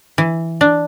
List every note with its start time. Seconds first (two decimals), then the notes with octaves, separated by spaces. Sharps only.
0.18 E3
0.61 D4